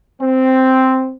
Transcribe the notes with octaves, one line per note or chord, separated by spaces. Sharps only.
C4